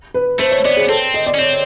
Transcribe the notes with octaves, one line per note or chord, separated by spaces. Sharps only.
B4
A3 C5
C#5
B3 D5
G#4
C4 A4
D#5
D5
C#4
C4 C#5